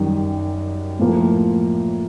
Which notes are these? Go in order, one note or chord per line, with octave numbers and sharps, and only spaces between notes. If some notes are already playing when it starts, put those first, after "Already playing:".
Already playing: F#2 D#3 G3
A2 F3 A#3